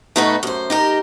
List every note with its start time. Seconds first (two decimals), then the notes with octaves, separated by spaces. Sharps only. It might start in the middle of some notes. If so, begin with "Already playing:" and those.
0.16 B2 A3 D#4 F#4 B4
0.43 F#2 C5
0.70 D#4 G4 A#4